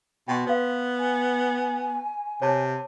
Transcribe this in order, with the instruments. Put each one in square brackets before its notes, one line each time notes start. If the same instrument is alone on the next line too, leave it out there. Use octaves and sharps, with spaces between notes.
[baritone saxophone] B2 [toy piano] G5 C6
[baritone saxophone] B3 [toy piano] B4 F5
[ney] G#5
[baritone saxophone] C3 [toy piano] C#5 A5